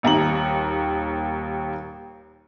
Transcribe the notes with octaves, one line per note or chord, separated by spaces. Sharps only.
D#1 D#2 A#5 F#7